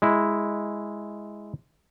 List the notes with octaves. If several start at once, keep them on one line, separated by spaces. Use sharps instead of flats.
G#3 E4